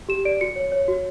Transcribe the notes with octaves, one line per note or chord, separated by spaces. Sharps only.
G4 E7
D5 D7
F#4 C#7
C#5
C#5
F#4